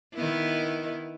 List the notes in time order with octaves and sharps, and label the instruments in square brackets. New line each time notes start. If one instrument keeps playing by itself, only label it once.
[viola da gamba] D#3 B3 E4